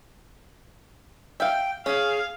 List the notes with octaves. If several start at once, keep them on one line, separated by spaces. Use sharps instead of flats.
E5 F5 G5
C#4 G#4 F5